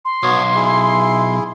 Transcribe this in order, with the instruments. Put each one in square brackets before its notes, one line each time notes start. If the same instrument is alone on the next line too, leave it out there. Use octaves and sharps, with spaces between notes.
[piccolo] C6
[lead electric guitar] B1 [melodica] B3 F#4 C#5
[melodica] E4 G#4